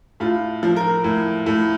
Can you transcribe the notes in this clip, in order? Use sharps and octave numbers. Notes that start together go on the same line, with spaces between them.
A2 F4
F3
A#4
A2
A2